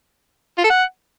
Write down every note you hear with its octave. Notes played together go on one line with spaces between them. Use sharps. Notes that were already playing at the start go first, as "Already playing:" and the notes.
F4
A4
F#5